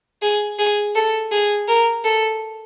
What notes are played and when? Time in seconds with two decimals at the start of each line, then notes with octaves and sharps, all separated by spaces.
0.22 G#4
0.59 G#4
0.95 A4
1.32 G#4
1.68 A#4
2.04 A4